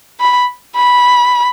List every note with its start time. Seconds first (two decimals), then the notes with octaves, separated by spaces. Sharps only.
0.20 B5
0.76 B5